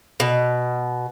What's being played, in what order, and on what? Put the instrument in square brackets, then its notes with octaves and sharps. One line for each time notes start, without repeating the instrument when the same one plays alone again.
[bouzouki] B2